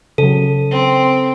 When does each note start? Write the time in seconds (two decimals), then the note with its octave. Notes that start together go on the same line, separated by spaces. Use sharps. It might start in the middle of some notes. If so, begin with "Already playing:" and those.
0.18 C#3 F#3 A4
0.71 C4